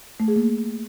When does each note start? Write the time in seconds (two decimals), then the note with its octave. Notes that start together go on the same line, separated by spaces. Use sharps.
0.20 A3
0.28 G#4
0.36 A#3